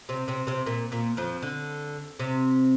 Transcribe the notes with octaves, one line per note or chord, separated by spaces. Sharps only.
C3 C4
C3 C4
C3 C4
A#2 A#3
A#2 A#3
F2 F3
D3
C3